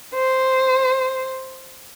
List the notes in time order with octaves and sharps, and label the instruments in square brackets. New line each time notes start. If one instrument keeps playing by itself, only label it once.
[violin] C5